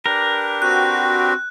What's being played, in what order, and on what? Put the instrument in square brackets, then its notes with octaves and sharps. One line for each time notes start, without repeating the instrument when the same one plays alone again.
[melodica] D4 G4 B4 [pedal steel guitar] A#4
[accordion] C4 F#4 [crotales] F#6